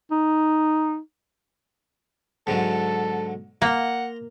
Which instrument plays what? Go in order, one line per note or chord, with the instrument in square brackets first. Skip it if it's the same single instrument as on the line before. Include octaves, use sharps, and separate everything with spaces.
[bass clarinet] D#4
[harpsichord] G#2 D3 F#3 [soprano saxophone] A4
[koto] A#3 [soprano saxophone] F#5 [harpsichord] A#5 C6